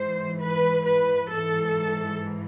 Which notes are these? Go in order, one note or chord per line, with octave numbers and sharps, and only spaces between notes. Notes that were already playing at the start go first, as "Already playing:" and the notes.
Already playing: G#2 E3 C5
B4
B4
G#2 E3 A4